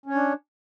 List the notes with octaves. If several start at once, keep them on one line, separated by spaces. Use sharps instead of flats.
C#4 D4 C#5